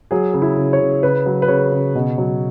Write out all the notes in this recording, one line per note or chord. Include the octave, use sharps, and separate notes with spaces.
F#3 G#4
C#3
E4
C#3
C#5
C#3
C#3 B4
F#3
B4
C#3 C#5
C#3
B2
F#3